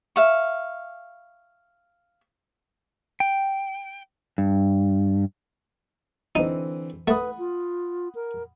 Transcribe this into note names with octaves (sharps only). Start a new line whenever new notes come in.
E5 F5 C#6
G5
G2
D3 E3 C4 D#4
A3 B4 F#5 B5 D#6
F4
A#4